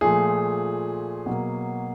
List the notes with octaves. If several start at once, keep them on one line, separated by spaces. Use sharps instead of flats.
A#2 F3 A3 G#4
B2 F#3 A#3